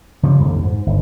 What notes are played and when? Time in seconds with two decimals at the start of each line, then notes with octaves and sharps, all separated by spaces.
0.23 C#3 F3 G3
0.39 A#1 F2 D#3 G3
0.63 G#2
0.87 G1